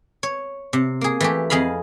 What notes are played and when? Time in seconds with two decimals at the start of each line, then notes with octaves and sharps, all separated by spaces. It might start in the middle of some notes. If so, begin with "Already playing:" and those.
0.23 C#5
0.73 C3
1.01 A#3 G#4
1.21 E3 A3 G4
1.50 F2 G#4 D#5 F5 B5